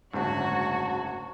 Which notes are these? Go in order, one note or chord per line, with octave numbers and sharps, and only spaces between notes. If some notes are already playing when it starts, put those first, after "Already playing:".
F#1 D2 G#2 F#4 C#5 A5